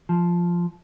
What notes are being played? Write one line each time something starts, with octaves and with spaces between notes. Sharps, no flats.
F3